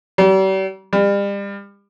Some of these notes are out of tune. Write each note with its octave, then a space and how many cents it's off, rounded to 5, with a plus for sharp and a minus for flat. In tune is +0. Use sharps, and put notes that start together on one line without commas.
G3 -40
G3 +35